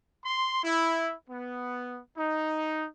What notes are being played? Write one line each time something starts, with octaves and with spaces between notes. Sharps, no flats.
C6
E4
B3
D#4